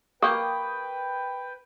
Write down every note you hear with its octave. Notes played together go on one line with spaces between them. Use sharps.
A#3 G4 B4 G5 C#6 D#6